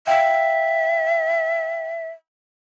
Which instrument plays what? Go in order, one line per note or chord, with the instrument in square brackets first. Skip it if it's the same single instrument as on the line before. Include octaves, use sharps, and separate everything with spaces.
[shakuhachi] E5 [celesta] F5 G5